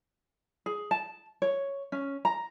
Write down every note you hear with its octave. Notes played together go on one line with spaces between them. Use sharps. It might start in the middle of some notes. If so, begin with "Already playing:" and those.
G#4
A5
C#5
C#4
A#5